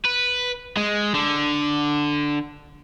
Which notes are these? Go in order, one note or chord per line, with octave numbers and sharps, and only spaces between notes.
B4
G#3
D3